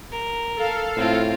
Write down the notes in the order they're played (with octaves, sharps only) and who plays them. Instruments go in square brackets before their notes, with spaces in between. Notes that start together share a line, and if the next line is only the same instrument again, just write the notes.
[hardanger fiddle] A#4
[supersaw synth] A4 F5
[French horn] A2 [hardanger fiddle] C4 F4